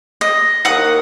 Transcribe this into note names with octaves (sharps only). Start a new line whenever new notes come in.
D#5
D#2 A#3 F#5 D#6